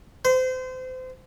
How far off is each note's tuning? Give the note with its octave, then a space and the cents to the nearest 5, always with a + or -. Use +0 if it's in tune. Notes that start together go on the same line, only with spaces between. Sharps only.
C5 -30